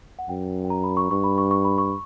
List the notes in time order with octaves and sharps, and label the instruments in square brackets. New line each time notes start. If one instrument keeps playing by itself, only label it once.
[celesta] F#5
[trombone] F#2 [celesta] G5
[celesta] G5
A#5
B5
C#6
[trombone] G2 [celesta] C#6
[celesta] B5
C#6
C#6
B5
C#6